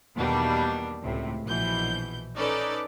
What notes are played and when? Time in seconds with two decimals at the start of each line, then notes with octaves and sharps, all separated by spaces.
0.16 E2 B2 D#3 G3 A#3 D4
1.03 C#2 A2 C3
1.45 A#1 B2 E3 G6
2.36 C#4 D#4 A4 B4 D5